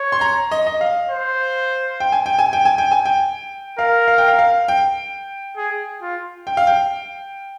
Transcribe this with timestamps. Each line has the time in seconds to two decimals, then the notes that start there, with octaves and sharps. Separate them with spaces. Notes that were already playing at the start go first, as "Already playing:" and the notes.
Already playing: C#5
0.12 C6
0.21 A#5
0.51 D#5
0.67 D#5
0.81 F5
1.10 C5
2.00 G5
2.12 G#5
2.26 G5
2.39 G#5
2.53 G5
2.65 G#5
2.78 G5
2.92 G#5
3.05 G5
3.79 A#4 F5
4.08 F5
4.18 G5
4.28 F5
4.39 F5
4.68 G5
5.57 G#4
6.02 F4
6.47 G5
6.57 F5
6.67 G5